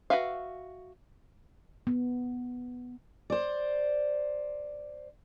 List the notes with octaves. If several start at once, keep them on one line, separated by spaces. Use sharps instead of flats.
F#4 A4 B4 E5 F5
B3
C5 D5